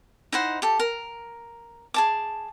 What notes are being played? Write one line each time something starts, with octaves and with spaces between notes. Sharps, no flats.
D#4 E4 C5 F#5
G4 A4
A#4
G#4 A5 D6